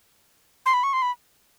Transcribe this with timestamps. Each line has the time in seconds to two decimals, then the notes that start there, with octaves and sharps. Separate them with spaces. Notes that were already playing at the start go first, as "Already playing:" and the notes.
0.66 C6
0.73 B5
0.83 C#6
0.93 C6
1.02 B5